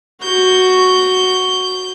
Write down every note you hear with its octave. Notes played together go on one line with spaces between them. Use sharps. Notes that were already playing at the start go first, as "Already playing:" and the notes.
F#4 G6